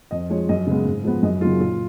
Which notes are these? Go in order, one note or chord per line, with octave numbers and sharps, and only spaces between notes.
F2 D#5
F3 G#3 C#5
F#2 D#5
C#3 G#3 B3
G#2
F3 G#3 B3
F#2 D#5
C#3 F#3 A#3 F4
A#2 F4